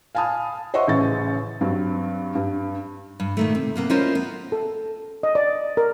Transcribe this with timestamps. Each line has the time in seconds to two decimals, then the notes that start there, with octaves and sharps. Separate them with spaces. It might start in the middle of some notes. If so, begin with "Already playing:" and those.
0.15 F5 G#5 A5 B5 D#6 F6
0.74 C5 D#5 E5 F#5 C6 C#6
0.88 A1 C#3 C#6 A6
1.61 G2 F#3 C4
2.35 G2
3.20 G2
3.37 A#2 D#3 A3
3.55 C3
3.76 C3 A#3 B3
3.90 C#4 E4 F4 A#4 C5 D#5
4.15 B3
4.52 A4
5.23 D#5
5.35 D5
5.77 A#4